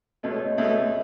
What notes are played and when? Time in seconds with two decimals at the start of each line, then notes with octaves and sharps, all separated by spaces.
0.23 C#2 B2 A3 D#5
0.32 C#5
0.40 D#5
0.57 C#2 B2 A3 E5